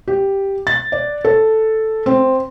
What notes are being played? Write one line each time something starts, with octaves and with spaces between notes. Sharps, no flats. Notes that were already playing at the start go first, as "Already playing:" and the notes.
G4
A6
D5
A4
C4